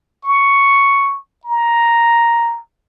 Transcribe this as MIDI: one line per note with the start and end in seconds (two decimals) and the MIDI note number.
0.24 1.19 85
1.45 2.59 82